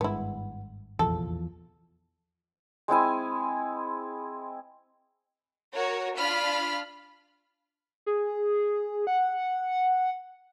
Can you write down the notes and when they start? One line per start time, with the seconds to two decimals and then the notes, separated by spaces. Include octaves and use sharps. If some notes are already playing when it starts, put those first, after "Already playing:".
0.01 G#1 G2 G#3 B3 E4
0.99 F1 A#1 E2 F3 A4
2.88 G#3 C4 E4 G#5
5.75 F#4 A#4 C#5
6.16 D4 F4 B5 F6
8.06 G#4
9.07 F#5